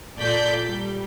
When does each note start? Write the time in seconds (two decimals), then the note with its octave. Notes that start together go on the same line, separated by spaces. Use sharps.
0.18 A#2 A4 D5 G6 B6
0.68 G3